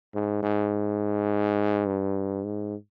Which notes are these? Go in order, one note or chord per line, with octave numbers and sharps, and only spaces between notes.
G#2
G#2
G2
G#2